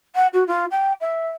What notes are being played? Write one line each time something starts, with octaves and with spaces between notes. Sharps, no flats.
F#5
F#4
F4
G5
E5